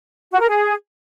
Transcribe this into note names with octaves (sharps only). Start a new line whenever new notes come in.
F#4
A#4
G#4